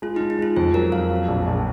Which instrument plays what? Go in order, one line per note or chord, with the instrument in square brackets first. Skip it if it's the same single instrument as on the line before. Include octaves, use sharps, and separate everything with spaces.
[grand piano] G#3 [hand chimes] F4
[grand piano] G#3 [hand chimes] D#4
[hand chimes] D#4
[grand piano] G#3 [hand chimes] F4
[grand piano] F2 [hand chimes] C5
[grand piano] F#3 [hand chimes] A#4
[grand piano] F2 [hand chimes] F5
[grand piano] F#3
A#1
A#1